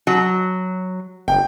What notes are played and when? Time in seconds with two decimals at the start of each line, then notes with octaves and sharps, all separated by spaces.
0.07 F#3
1.28 F#1 G5